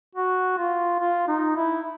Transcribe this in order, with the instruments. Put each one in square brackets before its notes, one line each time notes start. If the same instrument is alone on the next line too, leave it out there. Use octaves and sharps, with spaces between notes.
[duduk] F#4
F4
F4
D#4
E4